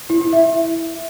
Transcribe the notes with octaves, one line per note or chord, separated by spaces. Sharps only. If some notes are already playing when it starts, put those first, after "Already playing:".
E4
E4
E5